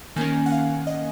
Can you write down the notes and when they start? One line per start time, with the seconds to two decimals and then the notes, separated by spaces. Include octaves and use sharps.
0.16 D#3 A#3 C#4 G#5
0.46 F#5
0.52 F5
0.87 D#5